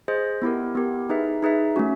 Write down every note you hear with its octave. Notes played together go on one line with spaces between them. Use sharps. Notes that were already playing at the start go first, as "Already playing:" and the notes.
G#4 C5 D#5
B3 E4 G4 A#4
B3 E4 G4 A#4
D#4 G#4 B4 E5
D#4 G#4 B4 E5
A3 C#4 F#4